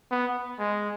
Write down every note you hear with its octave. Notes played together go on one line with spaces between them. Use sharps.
B3
G#3